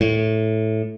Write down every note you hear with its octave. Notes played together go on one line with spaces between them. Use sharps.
A2